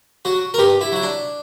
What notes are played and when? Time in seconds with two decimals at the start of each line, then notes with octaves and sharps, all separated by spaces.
0.25 F#3 F#4
0.54 A#4
0.58 G2 G4
0.81 E4
0.92 F#3 E4
1.03 D4